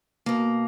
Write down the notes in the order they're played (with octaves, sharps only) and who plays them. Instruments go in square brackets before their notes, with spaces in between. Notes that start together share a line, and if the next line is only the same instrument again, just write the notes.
[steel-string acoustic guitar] B2 A#3